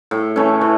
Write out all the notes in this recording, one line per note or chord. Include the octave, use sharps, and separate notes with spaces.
A2
E3 A3 C#4
E3